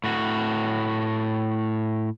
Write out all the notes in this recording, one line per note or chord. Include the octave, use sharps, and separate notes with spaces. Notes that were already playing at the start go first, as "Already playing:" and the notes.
A2 F#4